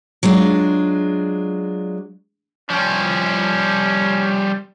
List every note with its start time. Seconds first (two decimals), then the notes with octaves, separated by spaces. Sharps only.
0.23 F#3 G#3 D4 F4
2.70 F3 G3 C#4